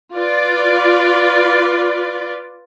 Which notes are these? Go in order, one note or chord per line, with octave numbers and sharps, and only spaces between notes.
F4 B4 D5